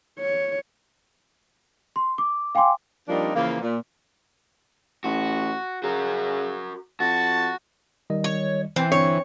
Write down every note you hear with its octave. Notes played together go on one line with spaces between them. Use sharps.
C#5
C6
D6
F5 G5 G#5 C6 D6
F3 G3 A#3 C4 D4 D#4
C#3 E3 F3 A#3
A#2
A1 F#4
C#3 F#4 A#4
F2 F#4 A5
D#3 G3 D#5
C#5
E3 C4
G1 D4 C#5